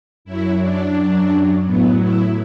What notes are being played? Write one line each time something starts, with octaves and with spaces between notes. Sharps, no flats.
F#2 F#3 E4
D4
F#2 F#3
A2 F#3 B3
E4